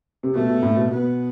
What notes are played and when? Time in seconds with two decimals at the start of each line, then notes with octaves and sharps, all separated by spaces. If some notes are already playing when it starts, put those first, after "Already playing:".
0.23 C3
0.35 B2 A3
0.49 B2
0.63 A2
0.76 B2
0.90 B2 B3